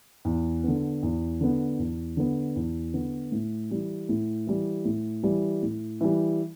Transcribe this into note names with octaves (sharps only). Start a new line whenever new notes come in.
E2
D3 B3
E2
D3 B3
E2
D3 B3
E2
D3 B3
A2
E3 G3
A2
E3 G3
A2
E3 G3
A2
E3 G3